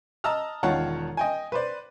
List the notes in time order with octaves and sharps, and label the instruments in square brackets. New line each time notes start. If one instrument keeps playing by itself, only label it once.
[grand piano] D#5 A5 A#5 E6 F6
E1 D#3 F4 C#5 F#5 A5
D#5 G5 G#5
B4 C5 D5